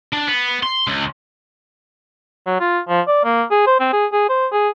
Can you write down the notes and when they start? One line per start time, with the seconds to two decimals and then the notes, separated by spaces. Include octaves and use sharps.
0.13 D4
0.28 B3
0.63 C6
0.88 C#2
2.46 F#3
2.60 F4
2.89 F3
3.07 D5
3.24 A#3
3.51 G#4
3.67 C5
3.80 C4
3.93 G#4
4.12 G#4
4.29 C5
4.52 G#4